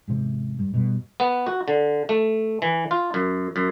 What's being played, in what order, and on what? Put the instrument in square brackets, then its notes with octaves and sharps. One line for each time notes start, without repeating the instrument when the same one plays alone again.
[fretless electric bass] E2 G#2 C3
G2
G2 B2
[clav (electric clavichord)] B3
F#4
D3
A3
E3
F4
F#2
F#2